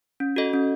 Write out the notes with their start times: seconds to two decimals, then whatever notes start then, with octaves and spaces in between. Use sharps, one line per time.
0.20 C#4
0.36 F#4 A4 D#5
0.53 C#4